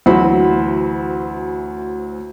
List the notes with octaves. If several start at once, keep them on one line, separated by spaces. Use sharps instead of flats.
D2 E3 F#3 C5 B5